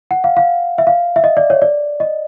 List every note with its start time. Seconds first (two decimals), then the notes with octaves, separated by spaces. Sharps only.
0.11 F#5
0.24 F5
0.37 F5
0.78 E5
0.87 F5
1.16 E5
1.24 D#5
1.37 D5
1.50 C#5
1.62 D5
2.00 D#5